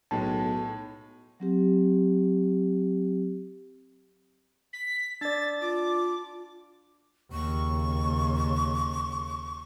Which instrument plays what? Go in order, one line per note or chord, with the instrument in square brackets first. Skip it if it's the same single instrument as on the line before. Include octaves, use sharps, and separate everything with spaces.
[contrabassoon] B1 [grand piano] A2 G#3 [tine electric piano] A5
[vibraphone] F#3 C4 G4
[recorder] B6
[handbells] D4 D5 [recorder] A6
[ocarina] F4 [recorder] D6
[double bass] D#2 C#3 [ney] C#6